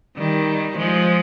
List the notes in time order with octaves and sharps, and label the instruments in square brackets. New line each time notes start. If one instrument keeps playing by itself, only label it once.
[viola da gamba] D#3 G3
F3 G#3